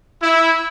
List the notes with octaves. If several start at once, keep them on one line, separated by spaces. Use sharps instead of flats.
E4